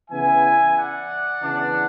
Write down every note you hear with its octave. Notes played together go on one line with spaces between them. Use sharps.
C#3 E3 B3 E4 E5 G#5
D5 F#5
C#3 E3 B3 D4